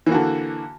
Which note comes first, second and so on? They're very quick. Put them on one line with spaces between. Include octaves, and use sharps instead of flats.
E3 A#3 F#4 D3